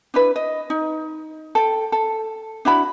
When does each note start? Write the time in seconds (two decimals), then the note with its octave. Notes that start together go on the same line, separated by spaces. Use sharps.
0.14 D4 E4 B4
0.36 D#5
0.70 D#4
1.55 A4 G5
1.92 A4
2.65 D4 E4 F#4 B5